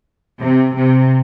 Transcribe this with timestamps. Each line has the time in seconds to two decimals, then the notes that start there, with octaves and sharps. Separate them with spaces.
0.40 C3
0.75 C3